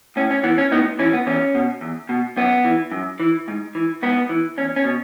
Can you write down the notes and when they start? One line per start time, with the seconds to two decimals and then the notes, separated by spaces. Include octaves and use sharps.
0.16 A2 C#4
0.31 C#4
0.43 E3 B3
0.58 C#4
0.71 A2 B3 D#4
0.99 E3 C#4
1.13 B3
1.27 E2 C#4
1.55 B2
1.81 E2
2.09 B2
2.36 F#2 B3
2.65 E3
2.91 F#2
3.20 E3
3.48 G#2
3.75 E3
4.02 G#2 B3
4.29 E3
4.58 E2 C#4
4.76 C#4
4.85 B2